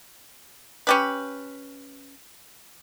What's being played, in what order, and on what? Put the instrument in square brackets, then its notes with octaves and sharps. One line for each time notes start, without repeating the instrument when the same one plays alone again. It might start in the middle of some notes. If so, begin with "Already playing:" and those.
[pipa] C#4 G4 B4